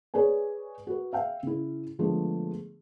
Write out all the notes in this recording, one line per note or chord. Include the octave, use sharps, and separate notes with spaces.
G#4 B4 C#5 D5 G#5
F#4 B4
E5 F5 G5
C#3 E4
D3 F3 G#3 A3 B3